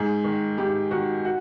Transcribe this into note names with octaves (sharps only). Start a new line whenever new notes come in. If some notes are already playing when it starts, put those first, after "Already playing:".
Already playing: G#2 G#4
D#3
G#2 G4
D#3 F#4
F#4